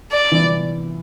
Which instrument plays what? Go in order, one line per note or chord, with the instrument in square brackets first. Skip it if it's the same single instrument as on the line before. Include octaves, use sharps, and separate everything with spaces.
[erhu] D5
[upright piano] E3